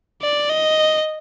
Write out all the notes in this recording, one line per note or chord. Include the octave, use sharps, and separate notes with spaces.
D5
D#5